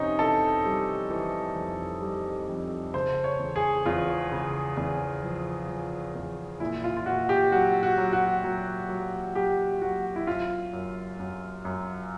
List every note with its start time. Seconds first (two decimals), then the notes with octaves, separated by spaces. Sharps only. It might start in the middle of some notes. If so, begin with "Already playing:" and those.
Already playing: F2 C3 C4 C#4 D#4
0.19 E3 A4
0.65 G3
1.10 E3
1.56 F2
2.02 G3
2.48 F2
2.94 C#3 C5
3.24 C#5
3.39 E2
3.56 G#4
3.86 E2 F4
4.31 C#3
4.77 E2
5.23 F3
5.68 F3
6.15 E2
6.60 A#2 E4
6.84 F4
6.97 F4
7.06 A#2 F#4
7.29 G4
7.52 F#3 F#4
7.83 F#4
7.98 F#3
8.13 F#4
8.44 F#3
8.89 F#3
9.35 F#3 G4
9.82 F#3 F#4
10.16 E4
10.27 F#2 F4
10.73 F#2
11.19 F#2
11.65 F#2